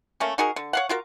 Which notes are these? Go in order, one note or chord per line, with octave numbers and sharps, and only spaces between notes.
A3 A#3 C#4
D#4 F#4 G#4 A#4
D3
C#5 F5 F#5
F4 F#4 A#4